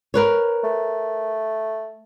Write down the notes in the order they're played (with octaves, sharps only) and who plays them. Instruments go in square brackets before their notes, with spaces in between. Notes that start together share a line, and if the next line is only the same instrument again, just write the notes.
[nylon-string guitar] A#4 B4 C#5
[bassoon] A3